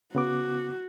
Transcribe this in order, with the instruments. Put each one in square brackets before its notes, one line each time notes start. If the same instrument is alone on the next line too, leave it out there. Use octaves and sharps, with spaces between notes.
[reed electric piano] C#3 B3 D6 [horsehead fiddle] F#4